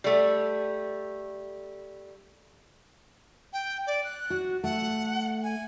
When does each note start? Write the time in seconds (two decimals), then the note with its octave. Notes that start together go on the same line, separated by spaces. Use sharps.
0.04 G3 A3
3.53 G5
3.87 D5
4.04 F#6
4.30 F#4
4.64 A3 F#5
5.43 G#5